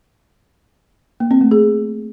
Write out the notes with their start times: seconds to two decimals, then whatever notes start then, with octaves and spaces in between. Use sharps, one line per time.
1.20 A#3
1.31 C4
1.41 A3
1.51 G#4